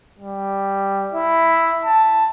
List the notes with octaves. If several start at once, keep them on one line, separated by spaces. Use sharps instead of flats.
G3
E4
A5